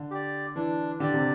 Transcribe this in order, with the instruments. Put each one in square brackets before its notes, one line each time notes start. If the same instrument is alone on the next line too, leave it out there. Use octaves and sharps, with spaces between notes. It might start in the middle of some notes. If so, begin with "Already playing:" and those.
Already playing: [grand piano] D3
[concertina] G4 D5
[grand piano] E3 [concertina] D4
[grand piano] D3 [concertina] G4 D5
[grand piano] C3